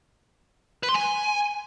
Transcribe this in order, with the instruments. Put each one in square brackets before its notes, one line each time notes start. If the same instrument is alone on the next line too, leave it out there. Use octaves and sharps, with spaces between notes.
[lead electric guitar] B4
C6
G#5